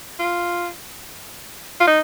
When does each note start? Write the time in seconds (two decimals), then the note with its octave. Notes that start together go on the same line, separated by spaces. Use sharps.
0.19 F4
1.80 F4
1.87 D#4